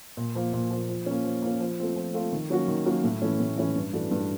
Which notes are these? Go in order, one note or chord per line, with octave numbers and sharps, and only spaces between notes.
A#2
F3 A#3
A#2
F3 A#3
F3
A#3 C#4
F3
A#3 C#4
F3
A3 C4 F4
F3
A3 C4 F4
D#3
F#3 A#3 C#4 F#4
D#3
F#3 A#3 C#4 F#4
A2
E3 A3 C#4
A2
E3 A3 C#4
G2
E3 A3 D4 F#4
G2